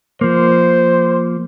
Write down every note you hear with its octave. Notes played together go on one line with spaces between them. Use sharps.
F3 A#3 C5